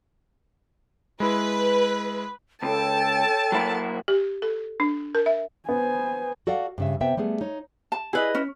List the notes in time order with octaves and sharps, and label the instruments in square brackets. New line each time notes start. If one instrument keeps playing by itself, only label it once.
[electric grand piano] G#3 E4 [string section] B4
[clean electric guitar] C#2 [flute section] A4 C#5 G5 [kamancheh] A5
[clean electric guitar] F#3 A#3 E4
[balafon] G4
A4
D4
A#4
E5
[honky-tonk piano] B3 [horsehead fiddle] C5 G#5
[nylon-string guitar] F#4 A4 D5 F5 F#5
G2 C#3 E5
C3 B3 E5 G5
G3 A3 B3 G#4
D#4 C#5
[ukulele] A5
[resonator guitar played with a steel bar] E4 B4 D#5 [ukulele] G#4
[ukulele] C#4